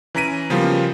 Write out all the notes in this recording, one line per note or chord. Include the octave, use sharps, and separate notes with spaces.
E3 C#4 A#5 B6 D7 D#7
C#3 F3 G3 A#3 B3 F4